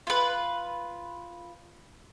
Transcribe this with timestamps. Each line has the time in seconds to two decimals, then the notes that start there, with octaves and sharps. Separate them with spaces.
0.07 F4 B4